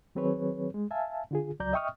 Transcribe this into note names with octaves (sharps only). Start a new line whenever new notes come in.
D#3 F#3 C4 G#4 B4 C#5
G#3
E5 F5 G#5 A5
D3 F4 G#4
C#2 F#3 D5 A#5 G6
D#5 E5 G5 C#6 D#6 F6